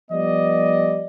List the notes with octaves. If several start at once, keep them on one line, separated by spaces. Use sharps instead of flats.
F3 G3 B3 D5 D#5